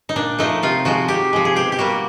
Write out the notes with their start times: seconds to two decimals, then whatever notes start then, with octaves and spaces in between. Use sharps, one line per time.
0.09 D#4
0.16 A#2 D4
0.39 F3 A3 D#4
0.63 C3 F4
0.85 F3 G#3 F#4
1.08 C3 G4
1.33 F3 G#3
1.45 G#4
1.56 B2 G4
1.72 G4
1.78 G3 A#3 F#4